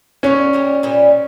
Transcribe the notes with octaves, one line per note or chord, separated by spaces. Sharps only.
D3 F#3 B3 C#4
A#2 G3 A#3
A#2 G3 B3